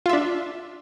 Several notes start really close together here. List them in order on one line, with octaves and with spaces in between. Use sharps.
F4 E5 D4